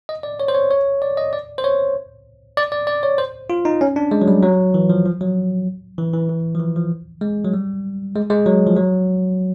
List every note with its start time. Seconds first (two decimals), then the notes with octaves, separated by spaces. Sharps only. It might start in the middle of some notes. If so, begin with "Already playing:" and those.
0.09 D#5
0.23 D5
0.40 C#5
0.48 C5
0.55 C#5
0.71 C#5
1.02 D5
1.17 D#5
1.33 D5
1.58 C5
1.64 C#5
2.57 D5
2.72 D5
2.87 D5
3.03 C#5
3.18 C5
3.50 F4
3.65 D#4
3.81 C#4
3.96 D4
4.11 G#3
4.22 F#3
4.28 G3
4.42 F#3
4.74 E3
4.90 F3
5.05 F3
5.21 F#3
5.98 E3
6.13 E3
6.29 E3
6.55 F3
6.60 E3
6.76 F3
7.21 G#3
7.45 F#3
7.54 G3
8.16 G#3
8.30 G#3
8.46 F#3
8.67 F3
8.76 F#3